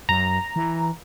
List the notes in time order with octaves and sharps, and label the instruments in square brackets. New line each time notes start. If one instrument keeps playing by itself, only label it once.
[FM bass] F#2 [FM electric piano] A#5
[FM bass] E3